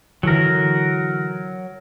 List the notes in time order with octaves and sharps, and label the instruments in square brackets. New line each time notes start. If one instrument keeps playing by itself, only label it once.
[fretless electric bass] D3 E3 [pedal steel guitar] F#3 A#4